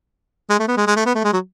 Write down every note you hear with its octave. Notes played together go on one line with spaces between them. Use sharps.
G#3
A3
B3
G#3
G#3
A3
B3
A3
G#3
F#3